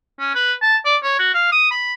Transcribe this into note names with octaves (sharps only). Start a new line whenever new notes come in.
C#4
B4
A5
D5
C#5
F#4
F5
D#6
B5